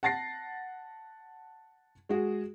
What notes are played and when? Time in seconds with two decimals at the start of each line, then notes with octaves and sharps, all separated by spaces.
0.03 F#5 A5 A6 A#6 C7
2.09 G#3 F#4 G#4